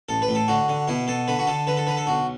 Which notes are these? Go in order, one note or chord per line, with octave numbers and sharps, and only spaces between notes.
A1 A4
B4
A2
A4
D3 F#4
D3
B2 E4
B2 A4
D3 B4
F#4
D3 A4
D3 B4
A4
D3 B4
A4
B1 F#4